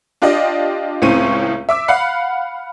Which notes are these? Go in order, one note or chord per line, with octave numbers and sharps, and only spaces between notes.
D4 F4 G4 D5 D#5
C#2 A2 C4 C#4 D#7
E5 D6 E6
F5 F#5 B5 F#6 C7